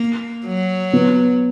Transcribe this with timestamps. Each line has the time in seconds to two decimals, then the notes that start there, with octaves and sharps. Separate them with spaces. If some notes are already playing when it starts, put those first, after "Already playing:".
Already playing: A#3
0.46 F#3
0.93 B3